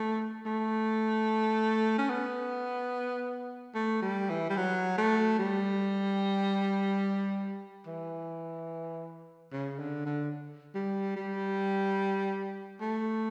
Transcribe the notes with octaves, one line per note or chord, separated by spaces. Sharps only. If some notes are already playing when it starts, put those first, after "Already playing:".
Already playing: A3
A3
C#4
B3
A3
G3
E3
G3
F#3
A3
G3
E3
C#3
D3
D3
G3
G3
A3